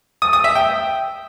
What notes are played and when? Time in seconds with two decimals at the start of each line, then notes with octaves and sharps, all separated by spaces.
0.22 D#6
0.33 D#6
0.44 E5
0.55 G5